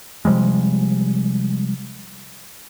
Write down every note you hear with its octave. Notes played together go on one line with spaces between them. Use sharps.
C3 F3 G3 G#3